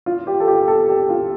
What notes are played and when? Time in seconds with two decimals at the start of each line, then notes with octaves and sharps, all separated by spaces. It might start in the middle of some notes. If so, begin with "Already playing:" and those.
0.06 F4
0.27 G4
0.40 A4
0.48 G4
0.68 A4
0.89 G4
1.09 F4